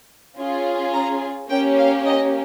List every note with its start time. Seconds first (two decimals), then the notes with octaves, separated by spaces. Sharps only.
0.37 C#4 F4 G#4
0.94 A#5
1.49 A#3 C#4 G4 G5
1.77 F5
2.06 D#5